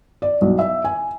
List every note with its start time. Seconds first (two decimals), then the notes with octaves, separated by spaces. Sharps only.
0.22 D5
0.41 B1
0.59 E5
0.84 G#5